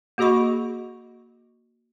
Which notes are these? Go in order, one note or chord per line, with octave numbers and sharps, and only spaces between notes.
A#3 F#4 G#4 D#5 B5 C#6